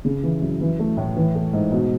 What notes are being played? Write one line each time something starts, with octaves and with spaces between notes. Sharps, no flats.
C#3
E3
F#2
E3
A3
A2
E3
A3
G#2
B2